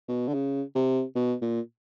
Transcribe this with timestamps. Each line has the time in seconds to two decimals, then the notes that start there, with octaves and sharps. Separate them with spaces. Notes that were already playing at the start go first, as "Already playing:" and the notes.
0.09 B2
0.28 D3
0.34 C#3
0.75 C3
1.16 B2
1.42 A#2